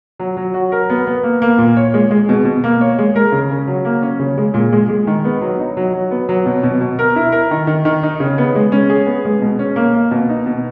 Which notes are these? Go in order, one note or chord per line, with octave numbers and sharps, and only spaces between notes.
F#3
F#3
F#4
A#4
B3
B3
A#3
A#3
A#2
C#5
G#3
G#3
B2
B2
A#3
C#5
G#3
A#4
C#3
C#4
F#3
A#3
C#4
C#3
G#3
A#2
G#3
G#3
D#3
B3
F#3
D#4
F#3
F#3
B3
F#3
B2
B2
B2
A#4
E4
A#4
D#3
D#3
D#3
D#4
C#3
B3
G#3
C#4
G#4
B3
G#3
B2
C#4
A#3
A#3
B2
D#4
B2